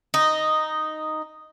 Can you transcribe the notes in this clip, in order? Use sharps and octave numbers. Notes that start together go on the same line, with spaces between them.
D#4